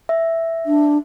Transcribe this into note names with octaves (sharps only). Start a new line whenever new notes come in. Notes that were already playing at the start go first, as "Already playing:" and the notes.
E5
D4